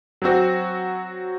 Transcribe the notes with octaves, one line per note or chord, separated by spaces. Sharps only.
F#3 C4 F#4